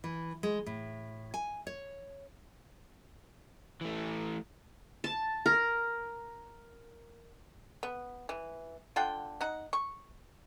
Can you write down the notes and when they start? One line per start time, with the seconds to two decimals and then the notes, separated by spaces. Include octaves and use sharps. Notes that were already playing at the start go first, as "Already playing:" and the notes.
0.04 E3
0.43 G#3
0.66 A2
1.34 G#5
1.67 C#5
3.81 E3 A3
5.04 A5
5.46 A#4
7.83 B3
8.29 E3
8.96 D3 F4 F#5 G5
9.41 D#4 F#5
9.73 C#6